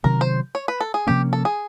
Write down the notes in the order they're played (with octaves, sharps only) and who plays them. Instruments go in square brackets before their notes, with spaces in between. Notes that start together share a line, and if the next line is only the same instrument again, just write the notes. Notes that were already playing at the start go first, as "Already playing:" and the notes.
[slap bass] C3 D#3 F#3 B3 [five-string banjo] A#4
[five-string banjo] C5
C#5
B4
A4
G#4
[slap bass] C3 F3 A#3 C#4 [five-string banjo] G4
[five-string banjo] A4
G#4